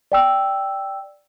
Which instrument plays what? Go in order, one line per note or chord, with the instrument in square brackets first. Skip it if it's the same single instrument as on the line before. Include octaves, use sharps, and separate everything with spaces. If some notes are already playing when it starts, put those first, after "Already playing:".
[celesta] D5 G5 E6